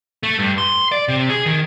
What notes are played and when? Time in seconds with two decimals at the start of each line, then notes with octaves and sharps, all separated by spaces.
0.23 A3
0.39 G2
0.58 C6
0.92 D5
1.08 C3
1.29 G#4
1.46 D#3